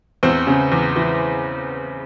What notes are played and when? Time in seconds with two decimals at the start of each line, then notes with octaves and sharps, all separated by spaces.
0.23 E2 C4 C5
0.47 C#3
0.72 E2
0.96 E3